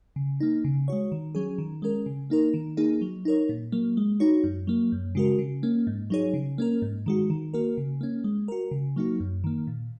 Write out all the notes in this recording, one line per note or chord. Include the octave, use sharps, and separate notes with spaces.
C#3
A#3 D#4
C#3
G#3 F#4 C#5
D#3
F#3 C#4 G#4
D#3
G#3 C#4 A#4
C#3
A#3 D#4 A#4
D#3
A#3 D#4 G#4
F#3
D#4 A#4 C#5
A#2
F#3 A#3
G#3
D#4 F#4 C#5
F#2
F#3 A#3
F#2
C#3 G#3 F#4 A#4
C#3
A#3 C#4
G#2
F#3 D#4 G#4 C#5
C#3
A#3 C#4 A#4
G#2
D#3 G#3 F#4
D#3
A#3 F#4 A#4
C#3
A#3 C#4
G#3
F#4 A#4
C#3
F#3 A#3 D#4 F#4
F#2
D#3 A#3
A#2